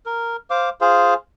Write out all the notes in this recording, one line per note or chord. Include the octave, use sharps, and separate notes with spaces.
A#4
C5 F5 D6
F4 G#4 C5 F5